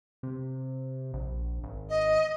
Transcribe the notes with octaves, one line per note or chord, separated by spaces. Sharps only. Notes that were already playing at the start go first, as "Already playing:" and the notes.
C3
A#1
G#1
D#5